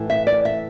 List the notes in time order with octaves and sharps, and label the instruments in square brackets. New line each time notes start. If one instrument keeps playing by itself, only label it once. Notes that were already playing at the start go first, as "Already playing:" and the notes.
Already playing: [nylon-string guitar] A2 E3 A3
E5
D5
E5